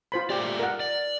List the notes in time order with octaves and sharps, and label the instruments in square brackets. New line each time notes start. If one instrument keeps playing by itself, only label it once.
[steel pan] F4 C5 B5
[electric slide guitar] A3 F4 D5 [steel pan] G4
[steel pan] A#4 F#5
[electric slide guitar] D5